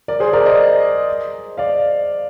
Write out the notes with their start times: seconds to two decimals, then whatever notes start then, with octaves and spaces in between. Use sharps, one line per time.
0.08 A#4 D5
0.20 G#4 C5
0.33 A#4 D5
0.46 C5 D#5
1.57 D5 F5